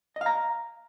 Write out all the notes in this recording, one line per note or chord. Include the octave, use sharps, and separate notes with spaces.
D#5 F5 A#5